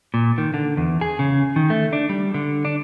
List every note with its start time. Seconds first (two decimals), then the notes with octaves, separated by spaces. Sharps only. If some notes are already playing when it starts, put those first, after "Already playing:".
0.14 A#2
0.38 D#3
0.54 D3
0.77 E2
1.01 G#4
1.19 C#3
1.56 D#3
1.70 A3
1.93 D4
2.09 G3
2.34 D3
2.65 D4